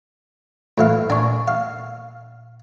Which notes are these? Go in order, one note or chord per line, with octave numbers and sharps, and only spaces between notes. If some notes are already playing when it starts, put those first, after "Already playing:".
A2 E3 F5
A#2 D4 G#5 C#6
F5